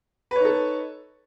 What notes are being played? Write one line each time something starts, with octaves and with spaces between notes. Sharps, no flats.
D#4 A4 B4 C#5